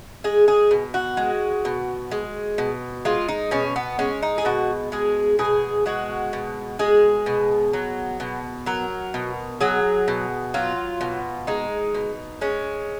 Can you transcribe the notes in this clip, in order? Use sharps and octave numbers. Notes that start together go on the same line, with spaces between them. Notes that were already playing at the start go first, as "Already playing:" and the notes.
G#3 G#4
G#4
B2
F#4
G#3
B2
G#3
B2
G#3 F4
D#4
B2 C#4
B3
G#3 C#4
D#4
G#4
B2 F#4
G#3 G#4
B2 G#4
G#3 F#4
B2
G#3 G#4
B2
F#3
B2
F#3 A#4
B2
F#3 G#4
B2
F#3 F4
B2
G#3 D#4
B2
G#3 C#4